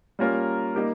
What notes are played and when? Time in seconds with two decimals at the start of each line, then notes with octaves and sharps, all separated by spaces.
0.19 G3 A#3 C#4 F4 A#4
0.75 G3 A#3 D#4 G4 A#4